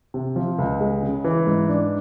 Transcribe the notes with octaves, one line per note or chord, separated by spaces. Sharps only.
C3
F3
C#2
G#3
C#3
E3
G#2
D4